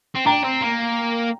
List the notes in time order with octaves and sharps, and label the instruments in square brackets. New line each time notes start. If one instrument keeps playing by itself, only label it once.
[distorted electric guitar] C4
[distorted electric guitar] D4 [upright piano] G5 A#5
[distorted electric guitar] C4
A#3